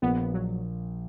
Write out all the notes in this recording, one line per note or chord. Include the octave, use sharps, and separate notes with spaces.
A#1 A#2 B3
F#3